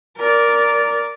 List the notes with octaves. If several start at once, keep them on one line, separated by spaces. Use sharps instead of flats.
A#4 D5